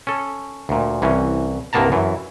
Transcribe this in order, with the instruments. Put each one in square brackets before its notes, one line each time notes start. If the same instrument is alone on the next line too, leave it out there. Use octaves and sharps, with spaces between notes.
[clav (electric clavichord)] C#4 A4
D2 A#2
C2 E3 C#4
C2 G2 A#3 B3 A5 A#5
F#2 E3